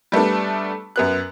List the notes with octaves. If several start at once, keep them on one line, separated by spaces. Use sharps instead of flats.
G3 A3 B3 D4
F#2 B3 F#6